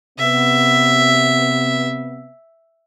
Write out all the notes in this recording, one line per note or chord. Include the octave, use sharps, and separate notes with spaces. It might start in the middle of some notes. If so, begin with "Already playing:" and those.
C3 B3 E5